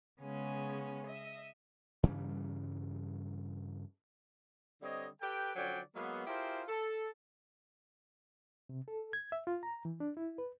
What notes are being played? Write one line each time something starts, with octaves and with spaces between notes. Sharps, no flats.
C#3 G#3 B3 C#4
D#5 E5
G2 C#3 E3 G3
D3 G3 C4 C#5 D#5
G4 A4 B4 G5
D3 F3 F#3 C#4 D5 G5
F#3 G#3 A#3 B3
E4 F4 G4 G#4 A#4 C5
A4
C3
A4
G#6
E5
F4
A#5
E3
D4
E4
B4